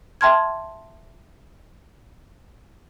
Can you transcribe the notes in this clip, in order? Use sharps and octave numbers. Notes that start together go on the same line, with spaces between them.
E5 G5 A5 C6 F6 G#6